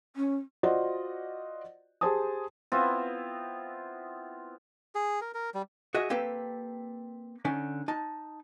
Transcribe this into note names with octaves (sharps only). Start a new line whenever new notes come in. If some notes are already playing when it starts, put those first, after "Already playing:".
C#4
F4 F#4 C5 D5 D#5 F#5
G4 G#4 C5 G#5 A5 D#6
B3 C4 E4 F4
G#4
A#4
A#4
G3
F#4 G#4 D#5 E5
A#3 C4 G4 A4 B4
D3 C#4 D#4
D#4 A5